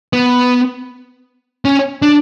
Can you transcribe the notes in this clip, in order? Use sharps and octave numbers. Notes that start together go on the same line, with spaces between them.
B3
C#4
D4